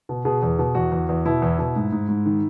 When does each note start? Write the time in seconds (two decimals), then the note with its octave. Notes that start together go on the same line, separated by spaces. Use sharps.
0.09 B2
0.25 B2 G#4
0.43 E2
0.59 B2
0.75 E2 F#4
0.92 E2
1.09 E2
1.25 B2 E4
1.42 E2
1.59 B2
1.76 G#2
1.92 G#2
2.09 G#2
2.26 D#3